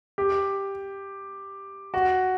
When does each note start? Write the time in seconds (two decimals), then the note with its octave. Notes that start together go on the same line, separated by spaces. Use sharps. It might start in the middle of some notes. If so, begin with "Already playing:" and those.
0.18 G4
1.94 F#4